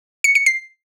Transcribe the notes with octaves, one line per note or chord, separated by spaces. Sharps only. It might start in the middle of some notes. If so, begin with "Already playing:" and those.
C#7
C#7
C7